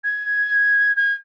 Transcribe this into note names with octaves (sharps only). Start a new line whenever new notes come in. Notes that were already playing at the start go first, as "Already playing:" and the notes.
G#6
G#6